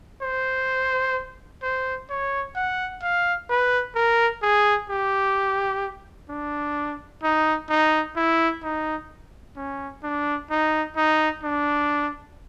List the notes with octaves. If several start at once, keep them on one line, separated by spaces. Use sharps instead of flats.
C5
C5
C#5
F#5
F5
B4
A#4
G#4
G4
D4
D#4
D#4
E4
D#4
C#4
D4
D#4
D#4
D4